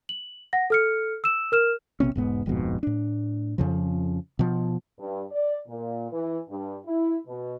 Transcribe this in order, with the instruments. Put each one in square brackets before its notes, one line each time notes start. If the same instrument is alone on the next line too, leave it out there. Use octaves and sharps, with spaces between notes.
[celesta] F#7
F#5 A#6
A4 F6 C#7
E6 E7
A#4 F6 E7
[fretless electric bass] A#1 C3 B3 C#4
E1 G#2 B3
D1 F2 G#2 B2
A2 D4
F2 C#3 F3
B2 F3
[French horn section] G2
D5
A#2
E3
G2
E4
B2